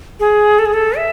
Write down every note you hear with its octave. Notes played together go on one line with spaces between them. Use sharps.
G#4
A4
G#4
A4
E5